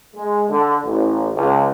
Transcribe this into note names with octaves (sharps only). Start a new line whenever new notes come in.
G#3
D3
A1
C#2